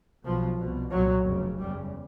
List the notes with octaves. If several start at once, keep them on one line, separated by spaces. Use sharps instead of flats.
B1 B2 F3
C2 B2
C2 A#2 F#3
F1 D#2 C#3
F#1 E2 C#3 G3